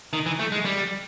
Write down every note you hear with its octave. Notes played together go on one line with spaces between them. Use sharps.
D#3
E3
A3
G#3
G3